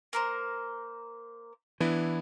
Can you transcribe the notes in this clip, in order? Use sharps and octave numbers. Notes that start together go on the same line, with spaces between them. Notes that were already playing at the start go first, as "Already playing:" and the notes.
A#3 A#4 C5
E3 B3 D4 E4